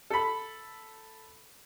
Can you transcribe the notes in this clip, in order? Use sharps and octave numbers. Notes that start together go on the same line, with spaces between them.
A4 B5